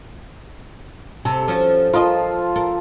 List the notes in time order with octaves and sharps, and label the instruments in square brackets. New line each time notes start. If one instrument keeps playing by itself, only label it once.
[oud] C3 [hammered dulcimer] A4
[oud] F3 C#4 F#4
[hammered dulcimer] F3 F4 [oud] A#4 D#5
[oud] A4 A#4